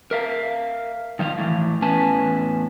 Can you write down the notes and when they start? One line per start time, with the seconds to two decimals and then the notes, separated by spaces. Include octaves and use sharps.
0.11 A#4 E5 F5
1.19 D#3 F3 E5 F5
1.38 A2 C#3 E3
1.82 E2 A2 C#4 B4 G#5 A5